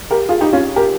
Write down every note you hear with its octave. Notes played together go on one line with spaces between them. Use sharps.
G4 A#4
F4 G#4
D#4 G4
C#4 F4
G4 A#4